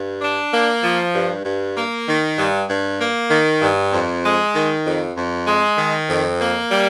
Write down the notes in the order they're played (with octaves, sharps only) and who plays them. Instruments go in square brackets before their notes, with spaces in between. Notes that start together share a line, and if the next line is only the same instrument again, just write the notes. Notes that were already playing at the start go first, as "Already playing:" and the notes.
Already playing: [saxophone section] G2
D4
A#3
F3
G2
G2
A#3
D#3
G2
G2
A#3
D#3
G2
F2
G#3
D#3
F2
F2
G#3
D#3
F2
A#3
G3